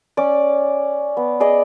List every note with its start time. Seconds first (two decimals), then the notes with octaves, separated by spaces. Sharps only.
0.17 C#4 D5
1.17 B3
1.40 G#4 D5 D#5